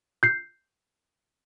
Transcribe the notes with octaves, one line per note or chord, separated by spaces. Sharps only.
G6 C7